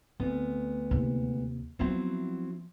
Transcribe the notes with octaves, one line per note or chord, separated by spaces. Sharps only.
D2 B3 C4
D#2 C3
F3 F#3 B3 C4 E4